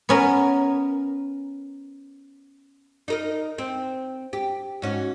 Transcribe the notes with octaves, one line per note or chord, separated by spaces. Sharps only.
B3 C#4 A#4
D#4 A#4 D#5
C4
G4
G#2 C#4 F#4